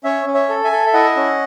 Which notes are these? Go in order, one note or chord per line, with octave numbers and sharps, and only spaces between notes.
C#4 C#5 E5
C#4
C#5 E5
A4
E5 G#5
A4
E5
E4 D#5 F#5
C#4